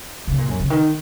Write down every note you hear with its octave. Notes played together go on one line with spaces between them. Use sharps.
C#3
A#2
F#2
C#3
D#3